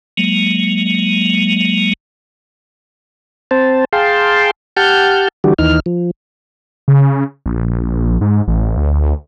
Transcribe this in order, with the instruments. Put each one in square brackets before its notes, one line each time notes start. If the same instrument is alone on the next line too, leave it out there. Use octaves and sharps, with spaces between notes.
[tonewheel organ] F#3 G#3 A#3
C4 C5 A5
G#4 F5 G5 A5 C6
G4 F#5 A5 F6 G6
D3 E3 G3 F#4 G4
D#2 E3 D#4 F6
F3
[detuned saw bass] C#3
A#1
G#2
A1
D2